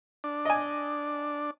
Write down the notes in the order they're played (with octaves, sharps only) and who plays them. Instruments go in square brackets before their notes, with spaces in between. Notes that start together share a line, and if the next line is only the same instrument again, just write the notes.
[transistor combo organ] D4
[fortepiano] D#5 G#5